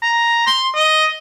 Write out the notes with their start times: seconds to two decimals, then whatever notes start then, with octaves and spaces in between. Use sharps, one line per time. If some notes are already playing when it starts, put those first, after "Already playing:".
0.02 A#5
0.47 C6
0.75 D#5